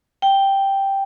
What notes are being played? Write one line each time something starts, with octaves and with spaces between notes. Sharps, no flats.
G5